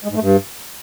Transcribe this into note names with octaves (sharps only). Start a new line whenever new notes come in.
G#3
G#2
A3
G2